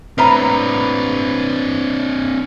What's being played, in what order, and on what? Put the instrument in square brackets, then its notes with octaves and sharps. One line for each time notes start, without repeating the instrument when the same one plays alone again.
[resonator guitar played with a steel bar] A2 B4 A#5 [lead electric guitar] C4 D4